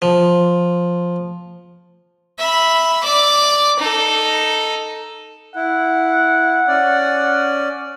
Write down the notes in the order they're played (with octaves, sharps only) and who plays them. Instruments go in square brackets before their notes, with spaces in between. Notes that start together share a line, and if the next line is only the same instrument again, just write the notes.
[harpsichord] F3
[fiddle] E5 B5
D5 D6
D#4 A4
[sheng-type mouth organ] E4 [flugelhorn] F#5
[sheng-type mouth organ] C#4 D5